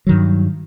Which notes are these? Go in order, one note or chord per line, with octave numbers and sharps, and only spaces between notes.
G2 D#3 F#3